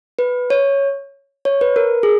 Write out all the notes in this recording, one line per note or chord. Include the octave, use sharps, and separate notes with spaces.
B4
C#5
C#5
B4
A#4
G#4